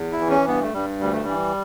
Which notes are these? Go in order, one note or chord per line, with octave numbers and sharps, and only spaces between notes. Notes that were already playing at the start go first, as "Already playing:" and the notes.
Already playing: E2
E4
E3
C#4
G2 B3
A3
G2 G3
D2 G3
A3
E3 G3